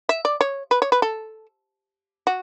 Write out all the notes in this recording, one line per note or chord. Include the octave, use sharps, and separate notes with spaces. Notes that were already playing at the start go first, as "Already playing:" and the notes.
E5
D5
C#5
B4
C#5
B4
A4
F#4